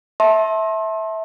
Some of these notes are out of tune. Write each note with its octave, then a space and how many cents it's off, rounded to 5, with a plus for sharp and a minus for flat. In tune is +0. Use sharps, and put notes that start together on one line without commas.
E5 -15 A5 +0 C6 +35